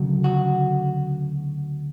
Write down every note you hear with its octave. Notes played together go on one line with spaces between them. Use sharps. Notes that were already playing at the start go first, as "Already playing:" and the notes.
Already playing: D2 C#3 F#3
F#4